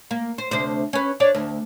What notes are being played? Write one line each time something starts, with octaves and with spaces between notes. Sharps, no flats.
A#3
C5
D2 C3 C5
C#4 B4
D4 C#5 D5
D2